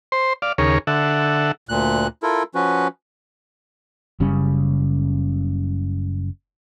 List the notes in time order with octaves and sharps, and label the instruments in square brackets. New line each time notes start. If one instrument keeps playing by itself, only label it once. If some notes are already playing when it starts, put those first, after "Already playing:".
[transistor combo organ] C5 C6
D5 F5
D#2 C#3 G#4 A#4 C#5
D3 A4 E5 F#5
[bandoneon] D2 A#2 F#6
E4 F4 A4 A#4
F3 C#4 F#4 B4
[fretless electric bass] F#1 C#3 G3 C#4